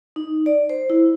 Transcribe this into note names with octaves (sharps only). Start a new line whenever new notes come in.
D#4
D5
C5
E4